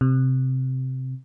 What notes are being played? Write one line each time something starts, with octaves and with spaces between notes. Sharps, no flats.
C3